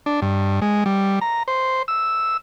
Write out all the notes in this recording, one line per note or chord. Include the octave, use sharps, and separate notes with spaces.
D4
G2
G#3
G3
A#5
C5
E6